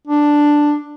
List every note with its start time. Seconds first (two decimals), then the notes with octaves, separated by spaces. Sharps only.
0.07 D4